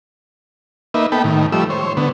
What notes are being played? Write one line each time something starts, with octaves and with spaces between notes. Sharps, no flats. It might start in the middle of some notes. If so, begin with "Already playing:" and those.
A#3 D#4 B4 E5
B3 A4 G5 B5
A2 D#3
F3 G3 A3 E6
C5 C#5
D3 B3